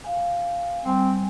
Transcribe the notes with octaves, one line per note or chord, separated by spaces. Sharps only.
F5 G#5
G3 C4 G#5